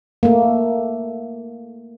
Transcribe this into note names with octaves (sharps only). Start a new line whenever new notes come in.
A3 A#3